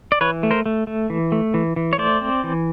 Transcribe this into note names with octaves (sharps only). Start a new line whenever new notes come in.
D5
E3 B4 C#5
A3
A#4 C5
A3
A3
E3
A3
E3
E3
C#5
A3 C5 D5
C4
E3